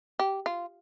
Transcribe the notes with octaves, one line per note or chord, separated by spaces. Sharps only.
G4
F4